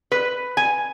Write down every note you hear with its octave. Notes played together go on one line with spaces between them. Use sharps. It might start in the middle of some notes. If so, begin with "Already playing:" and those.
B4
G#5